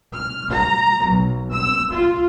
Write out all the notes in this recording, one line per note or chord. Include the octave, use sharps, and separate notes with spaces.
F6
A#5
B1
E6
F4